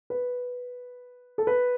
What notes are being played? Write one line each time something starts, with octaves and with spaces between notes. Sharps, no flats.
B4
A4
B4